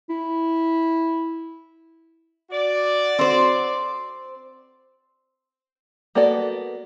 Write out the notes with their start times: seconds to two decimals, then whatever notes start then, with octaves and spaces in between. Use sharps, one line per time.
0.09 E4
2.51 F#4 D5
3.19 C4 C5
6.15 A#3 B3 F#4 A4 D5